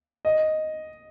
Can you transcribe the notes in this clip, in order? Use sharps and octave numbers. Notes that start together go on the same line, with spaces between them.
D#5